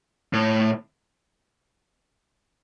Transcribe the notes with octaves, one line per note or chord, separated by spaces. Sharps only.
A2